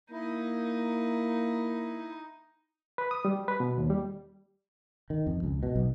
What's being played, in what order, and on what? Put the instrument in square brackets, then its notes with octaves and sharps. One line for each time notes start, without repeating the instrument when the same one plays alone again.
[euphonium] A#3 [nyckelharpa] D#4 [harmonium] E4
[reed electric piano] B4
D#6
G3
B4
B2
D#2
G3
[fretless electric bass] D#3
F2
C#2
B2
B1